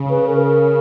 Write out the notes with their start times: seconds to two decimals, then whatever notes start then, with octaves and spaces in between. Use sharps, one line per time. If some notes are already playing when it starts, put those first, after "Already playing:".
Already playing: C#3
0.10 B4
0.27 A#4